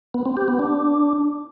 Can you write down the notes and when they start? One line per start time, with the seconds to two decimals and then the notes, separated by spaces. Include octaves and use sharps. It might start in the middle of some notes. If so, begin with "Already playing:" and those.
0.14 B3
0.26 C4
0.37 G4
0.48 B3
0.59 D4